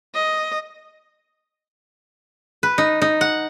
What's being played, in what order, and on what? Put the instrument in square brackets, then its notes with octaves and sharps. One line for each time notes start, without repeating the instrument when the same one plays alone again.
[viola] D#5
[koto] B4
D#4
D#4
F#5